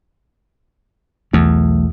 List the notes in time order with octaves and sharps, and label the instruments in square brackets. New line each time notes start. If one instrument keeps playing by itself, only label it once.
[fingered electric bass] B1 E3 A3 [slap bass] E2